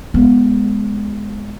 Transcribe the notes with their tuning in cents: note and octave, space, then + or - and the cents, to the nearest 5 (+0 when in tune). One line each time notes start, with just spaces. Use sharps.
G#3 +0 B3 +0